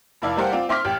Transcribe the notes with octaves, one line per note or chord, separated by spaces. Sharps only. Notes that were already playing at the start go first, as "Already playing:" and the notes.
F1 F2 E4 D5 F5
G3 G4 A#4 C5 F5 F#5
C4 F4 D5
C4 E5 C6 D6 F6 B6
A1 G4